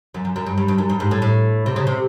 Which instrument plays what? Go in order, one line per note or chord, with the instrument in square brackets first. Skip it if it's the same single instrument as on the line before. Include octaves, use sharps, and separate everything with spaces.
[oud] F#2
F#2
F#2
G2
G2
G2
F#2
G2
G#2
A2
A2
C3
C#3
C3